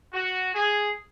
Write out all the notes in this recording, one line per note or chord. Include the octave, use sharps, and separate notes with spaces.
F#4
G#4